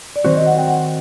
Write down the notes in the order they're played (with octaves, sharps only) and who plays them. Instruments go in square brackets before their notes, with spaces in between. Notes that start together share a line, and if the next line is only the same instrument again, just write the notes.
[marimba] D5
[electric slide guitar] D#3 F#3 C4 F#4 [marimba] C5
[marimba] D#5
F#5
G5
F#5